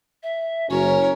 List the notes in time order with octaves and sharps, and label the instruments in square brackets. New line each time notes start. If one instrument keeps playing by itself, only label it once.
[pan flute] E5
[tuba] F#1 [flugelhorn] C#4 [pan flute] F#4 [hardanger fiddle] A#4 C#5